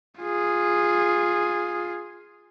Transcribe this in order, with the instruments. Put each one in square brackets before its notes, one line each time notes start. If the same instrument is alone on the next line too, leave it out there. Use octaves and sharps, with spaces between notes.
[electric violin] F4 G#4